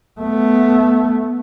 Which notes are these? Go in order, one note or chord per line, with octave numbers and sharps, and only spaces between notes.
A3 B3